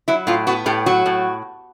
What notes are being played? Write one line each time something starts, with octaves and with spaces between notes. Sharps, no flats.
F#3 E4
A2 F4
B3 F#4
A2 G4
F#3 F#4
A2